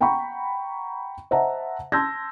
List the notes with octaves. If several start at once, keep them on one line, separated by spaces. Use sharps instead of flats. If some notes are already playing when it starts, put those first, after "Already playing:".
F#5 G5 A#5 B5 C#6
C5 D#5 E5 F#5 A5 A#5
A5 C6 E6 G6 G#6 A#6